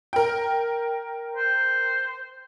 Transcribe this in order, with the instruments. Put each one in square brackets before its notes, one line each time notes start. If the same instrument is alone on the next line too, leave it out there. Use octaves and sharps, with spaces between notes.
[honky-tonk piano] A#4 G5
[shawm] C5